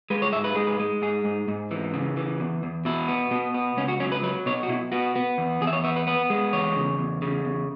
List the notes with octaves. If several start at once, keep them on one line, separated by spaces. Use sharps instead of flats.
G#3 B4
C#5
G#2 E5
B4
G#3 G#4
B4
G#3
G#2 G#4
G#2
G#2
E3
C#3
E3
E2
E2
B2 E4
B3
B2
B3
C#2 C#4
F#4
F#3 C#4
B4
F#3 B4
B2 C#5
F#4
B2 E4
B3 F#4
B3
E2
E2 G#4
E5
C#5
B3 E5
B4
B3 B4
G#3
E2 C#5
C#3
E2
C#3
E2